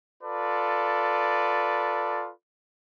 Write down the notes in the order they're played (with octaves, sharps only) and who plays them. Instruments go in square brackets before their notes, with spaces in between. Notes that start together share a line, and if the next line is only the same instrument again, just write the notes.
[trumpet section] F4 A4 B4 D5